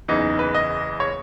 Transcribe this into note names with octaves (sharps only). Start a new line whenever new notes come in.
F#1 E2 C#3 E3 D#4
B4
D#5
C#5